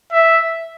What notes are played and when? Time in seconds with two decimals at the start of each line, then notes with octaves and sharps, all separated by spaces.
0.12 E5